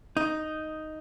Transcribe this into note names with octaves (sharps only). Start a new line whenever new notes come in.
D#4